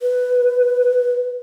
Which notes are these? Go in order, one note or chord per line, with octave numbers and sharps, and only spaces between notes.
B4